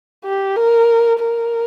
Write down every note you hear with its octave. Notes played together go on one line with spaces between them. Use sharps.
G4
A#4
A#4